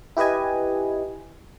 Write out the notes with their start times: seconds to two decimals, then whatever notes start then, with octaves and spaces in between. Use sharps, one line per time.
0.17 E4 G4 B4 D#5 G#5